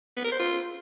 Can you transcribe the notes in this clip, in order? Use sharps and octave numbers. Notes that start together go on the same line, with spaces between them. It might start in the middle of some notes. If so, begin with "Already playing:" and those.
B3
A#4
C5
F4